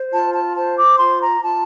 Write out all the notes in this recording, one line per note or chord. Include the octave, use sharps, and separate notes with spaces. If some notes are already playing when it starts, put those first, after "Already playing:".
Already playing: C5
F4 A5
A5
C5 A5
D6
F4 C6
A#5
F4 A5